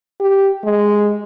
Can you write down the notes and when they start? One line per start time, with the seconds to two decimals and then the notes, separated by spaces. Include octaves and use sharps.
0.20 G4
0.64 G#3